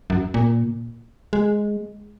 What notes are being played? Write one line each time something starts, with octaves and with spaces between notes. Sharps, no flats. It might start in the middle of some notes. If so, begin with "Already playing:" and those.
F#2
A#2
G#3